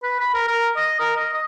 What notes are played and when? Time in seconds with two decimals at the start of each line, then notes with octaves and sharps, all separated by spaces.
0.03 B4
0.20 B5
0.34 A#4
0.48 A#4
0.76 D#5
1.00 A#4
1.16 D#5
1.33 D#5